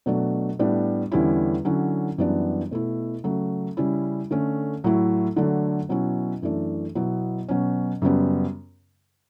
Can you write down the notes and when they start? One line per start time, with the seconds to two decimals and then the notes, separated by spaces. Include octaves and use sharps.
0.06 B2 F#3 A3 D4
0.59 A2 G3 B3 D4
1.12 E2 D3 G3 C#4 E4
1.65 D3 F#3 C#4 E4
2.18 F#2 E3 G3 B3 D4
2.71 B2 A3 E4
3.24 C#3 F#3 A3
3.77 C#3 G3 C#4 E4
4.31 D3 A3 C#4
4.84 A2 F#3 A3 E4
5.36 D3 F#3 A3 D4
5.89 B2 F#3 C#4 E4
6.42 F#2 E3 A3 D4
6.95 B2 F#3 B3 E4
7.48 B2 F#3 C#4
8.02 F#2 C#3 G3 B3